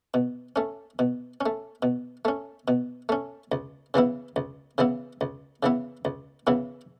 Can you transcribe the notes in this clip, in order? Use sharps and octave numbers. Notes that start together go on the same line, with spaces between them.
B2
A3 C#4
B2
C#4
A3
B2
A3 C#4
B2
A3 C#4
C#2
C#3 E3 B3 E4
C#2
C#3 E3 B3 E4
C#2
C#3 E3 B3 E4
C#2
C#3 E3 B3 E4